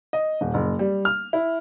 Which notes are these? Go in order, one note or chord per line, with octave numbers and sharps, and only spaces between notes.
D#5
D#1
F#1
G3
F6
E4